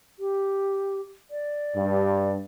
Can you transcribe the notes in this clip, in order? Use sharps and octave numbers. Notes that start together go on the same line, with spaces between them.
G4
D5
G2